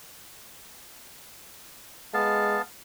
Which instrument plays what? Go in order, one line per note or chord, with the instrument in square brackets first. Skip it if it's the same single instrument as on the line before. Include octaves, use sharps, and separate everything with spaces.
[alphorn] G#3 [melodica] B3 F5 A5